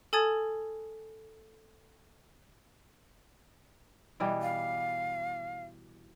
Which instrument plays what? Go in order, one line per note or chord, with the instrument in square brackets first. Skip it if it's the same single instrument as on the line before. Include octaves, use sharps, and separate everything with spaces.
[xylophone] A4 G#5 A5 D#6 G#6 A6
[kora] B2 E3 G3
[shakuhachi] F5